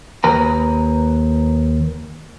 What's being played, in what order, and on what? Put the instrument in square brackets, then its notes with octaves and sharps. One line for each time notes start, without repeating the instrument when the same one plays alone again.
[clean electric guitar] D#2 B4 A#5